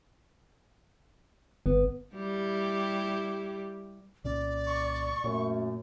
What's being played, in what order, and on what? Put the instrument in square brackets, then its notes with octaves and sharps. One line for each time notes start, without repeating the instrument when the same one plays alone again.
[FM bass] G1 [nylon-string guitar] B3
[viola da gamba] G3 E4 G4
[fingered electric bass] C2 A#2 C#4 [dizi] D5
[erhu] C#6
[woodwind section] F#2 A3 [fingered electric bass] A#2